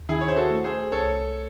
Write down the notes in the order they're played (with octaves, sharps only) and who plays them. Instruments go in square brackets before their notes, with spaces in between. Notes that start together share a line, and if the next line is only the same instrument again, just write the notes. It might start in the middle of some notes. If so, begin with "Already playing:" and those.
Already playing: [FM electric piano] D#2
[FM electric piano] D#3 [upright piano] E4 G#4
[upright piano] C#5
C5
F#4 A4
[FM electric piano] A3
[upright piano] G#4 C5
[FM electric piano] C2 [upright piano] A4 C#5